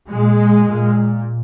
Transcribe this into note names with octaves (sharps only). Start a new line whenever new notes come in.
A#2 G#3
A#2